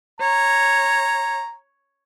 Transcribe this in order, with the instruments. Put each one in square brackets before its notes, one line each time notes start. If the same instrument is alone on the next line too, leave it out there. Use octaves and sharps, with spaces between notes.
[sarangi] C#5 [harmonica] A#5